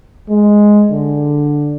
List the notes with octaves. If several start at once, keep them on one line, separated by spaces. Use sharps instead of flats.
G#3
D3